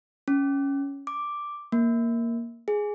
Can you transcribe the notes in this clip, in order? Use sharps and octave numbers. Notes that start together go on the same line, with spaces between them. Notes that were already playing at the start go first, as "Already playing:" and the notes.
C#4
D6
A#3
G#4